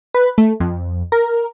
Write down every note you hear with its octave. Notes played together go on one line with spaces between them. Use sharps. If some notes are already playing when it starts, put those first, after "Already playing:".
B4
A3
F2
A#4